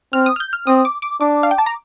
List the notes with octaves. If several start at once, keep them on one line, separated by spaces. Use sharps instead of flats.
C4 F6
D#6
F6
G6
F6
C4 D#6
D6
D6
D4 D6
F5
G5
A5
A#5